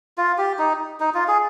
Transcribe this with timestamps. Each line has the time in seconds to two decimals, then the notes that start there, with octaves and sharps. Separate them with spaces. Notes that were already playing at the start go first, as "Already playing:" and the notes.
0.18 F4
0.38 G4
0.59 D#4
1.00 D#4
1.14 F4
1.28 G#4